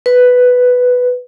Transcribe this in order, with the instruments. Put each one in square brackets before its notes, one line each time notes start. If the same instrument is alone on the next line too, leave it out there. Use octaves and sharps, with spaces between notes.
[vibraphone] B4